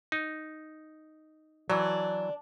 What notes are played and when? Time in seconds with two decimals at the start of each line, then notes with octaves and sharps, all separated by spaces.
0.12 D#4
1.70 E3 F#3 D4